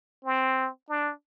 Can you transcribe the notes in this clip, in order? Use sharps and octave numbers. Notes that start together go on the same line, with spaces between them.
C4
D4